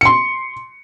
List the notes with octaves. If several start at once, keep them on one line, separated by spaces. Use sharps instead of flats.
C6 C#7